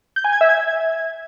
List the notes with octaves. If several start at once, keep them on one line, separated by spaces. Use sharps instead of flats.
G6
G#5
G#6
E5
G#6